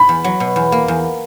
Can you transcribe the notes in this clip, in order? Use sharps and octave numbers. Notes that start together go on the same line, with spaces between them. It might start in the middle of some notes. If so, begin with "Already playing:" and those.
Already playing: B5
E2
F#3
B2
E2
A#3
E2